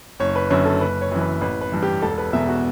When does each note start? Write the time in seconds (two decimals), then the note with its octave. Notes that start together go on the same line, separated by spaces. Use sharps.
0.20 F#1 C#5
0.36 B4
0.50 F#2 D3 C#5
0.65 A4
0.80 F#1 B4
1.01 C#5
1.12 F#2 E3
1.21 B4
1.41 A1 B4
1.61 B4
1.72 G2 E3
1.83 G4
2.02 E1 A4
2.18 B4
2.33 E2 B2 E5
2.49 F#4